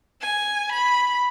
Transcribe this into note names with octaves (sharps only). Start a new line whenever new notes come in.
G#5
B5